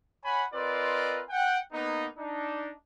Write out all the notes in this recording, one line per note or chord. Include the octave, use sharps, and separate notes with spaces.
C#5 F#5 G#5 B5
C4 F4 A#4 B4 D5 D#5
F#5 G5
A#3 B3 D#4
D4 D#4